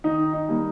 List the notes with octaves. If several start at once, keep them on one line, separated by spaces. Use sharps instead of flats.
D#3 D#4
D#4
G3 A#3